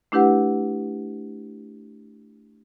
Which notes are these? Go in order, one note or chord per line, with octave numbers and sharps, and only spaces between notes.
A3 D4 E4 G4 B4 F#5